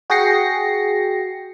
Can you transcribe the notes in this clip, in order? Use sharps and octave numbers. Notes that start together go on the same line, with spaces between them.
F#4 G#4 G5 A#6 C7 C#7